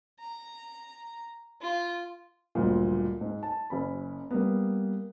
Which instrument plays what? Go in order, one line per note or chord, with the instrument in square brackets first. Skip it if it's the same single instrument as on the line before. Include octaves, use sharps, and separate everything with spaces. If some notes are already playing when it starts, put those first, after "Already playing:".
[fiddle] A#5
F4
[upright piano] F#1 D2 G2 A#2
G#2
A5
F#1 C#4 B5
G3 A#3 B3